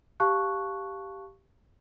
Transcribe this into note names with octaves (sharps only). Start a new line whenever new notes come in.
G4 F5 A5 C#6 F#6